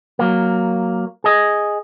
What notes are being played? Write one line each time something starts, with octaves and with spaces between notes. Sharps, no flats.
F#3 A#3
G#4 D#5